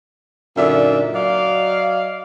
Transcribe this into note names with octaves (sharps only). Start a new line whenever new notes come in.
F#2 A#2 D3 D#4 D5 E5
F#3 D5 D#5 F5